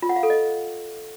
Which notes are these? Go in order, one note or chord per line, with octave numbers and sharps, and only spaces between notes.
F4
F#5
F5
A4
D#5